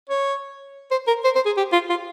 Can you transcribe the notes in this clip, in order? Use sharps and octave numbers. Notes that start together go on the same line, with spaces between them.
C#5
C5
A#4
C5
C5
G#4
G4
F4
F4